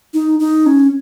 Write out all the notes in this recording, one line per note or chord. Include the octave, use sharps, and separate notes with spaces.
D#4
D#4
C#4